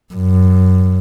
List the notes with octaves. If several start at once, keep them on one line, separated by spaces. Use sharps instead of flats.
F#2